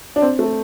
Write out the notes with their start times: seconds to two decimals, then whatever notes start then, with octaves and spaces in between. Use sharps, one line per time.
0.16 D4
0.22 C4
0.39 A3